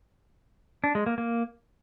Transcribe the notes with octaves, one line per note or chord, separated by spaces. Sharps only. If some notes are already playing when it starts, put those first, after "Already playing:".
D4
G#3
A#3
A#3